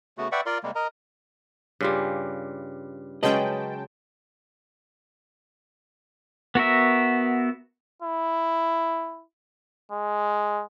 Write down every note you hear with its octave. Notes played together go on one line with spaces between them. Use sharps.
C#3 A3 B3 F#4
B4 D5 E5 F#5 G5 C#6
F4 A#4 D5 C6
C3 G3 G#3 A#3
A#4 D#5 A#5
G2 C#3 G3 F4 G4
C#3 F#3 G#3 C#4 B4 D#5 G5 A5
B3 F#4 A#4 E5
E4
G#3